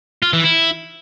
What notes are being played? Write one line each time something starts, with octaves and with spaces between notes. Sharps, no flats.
F4
E3
E4